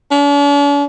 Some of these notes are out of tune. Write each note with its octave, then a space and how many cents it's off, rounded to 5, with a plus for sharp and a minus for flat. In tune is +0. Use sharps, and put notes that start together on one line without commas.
D4 -45